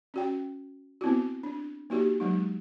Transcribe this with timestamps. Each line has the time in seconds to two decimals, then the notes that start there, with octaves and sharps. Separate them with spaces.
0.14 C#4 F#4 G5
1.01 B3 C4 E4 F#4
1.43 D4
1.90 A#3 D#4 F#4 G4
2.20 F#3 G#3 D#4